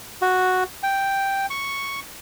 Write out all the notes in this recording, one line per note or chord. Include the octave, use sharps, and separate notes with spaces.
F#4
G5
C#6